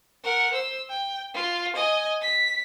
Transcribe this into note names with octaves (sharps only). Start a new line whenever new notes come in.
A#4 F#5
C5 E6
G5
F4
D#5 G#5
B6